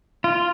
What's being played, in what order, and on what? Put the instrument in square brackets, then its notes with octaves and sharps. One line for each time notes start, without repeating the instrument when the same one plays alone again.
[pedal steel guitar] F4